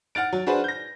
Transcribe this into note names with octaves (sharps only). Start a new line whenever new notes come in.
F#5 F6 A6 D7
F#3
D4 F#4 G#4 B4 C5
G6 A#6